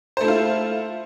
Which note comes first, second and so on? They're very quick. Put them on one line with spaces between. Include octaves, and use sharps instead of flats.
C5 A3 E4 F4